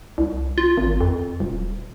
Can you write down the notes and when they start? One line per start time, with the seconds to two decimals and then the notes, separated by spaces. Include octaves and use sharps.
0.18 C2
0.58 F4
0.77 G#1
1.01 F2
1.40 D#1